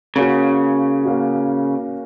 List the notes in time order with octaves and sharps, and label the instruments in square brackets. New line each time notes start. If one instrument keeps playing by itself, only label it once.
[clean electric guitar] C#3 [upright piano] A#3 C#4 F#4
[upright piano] A#3 C#4 F#4